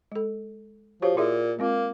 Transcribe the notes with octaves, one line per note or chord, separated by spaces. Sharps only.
G#3 A4
F3 F#4 G4 C#5
A#2 E4 G#4 E5
G#3 A#3 C4 F4